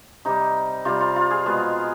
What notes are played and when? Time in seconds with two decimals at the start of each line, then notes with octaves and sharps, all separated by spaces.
0.25 C3 G3 D#4
0.85 C3 G3 F4
1.01 F4
1.16 F4
1.31 G#4
1.46 B2 G#3 B4